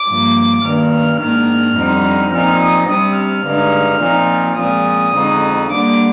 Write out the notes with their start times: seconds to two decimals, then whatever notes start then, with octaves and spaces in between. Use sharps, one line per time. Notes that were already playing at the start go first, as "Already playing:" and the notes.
Already playing: D6
0.08 G2 F3 A#3
0.64 G2 D#3 A#3 F6
0.92 F6
1.20 G#2 D#3 A#3 D4 F6
1.77 F2 D3 G3 C4 D#4
2.33 A#2 F3 C4 D#4 F6
2.62 D#6
2.90 C3 G3 D4 D#6
3.18 F6
3.46 G2 D3 G#3 D#4
4.02 A#2 F3 C4 D#4
4.59 A#2 F3 G#3 C4 D#6
5.15 F2 D3 G#3 D#4
5.71 D3 G3 A#3 D4 D6